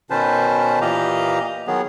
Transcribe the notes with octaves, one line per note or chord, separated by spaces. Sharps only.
B2 D#3 C#4 B4 C5 A5
A#2 E3 G4 D#5 F5 A#5
D#3 F#3 B3 G#4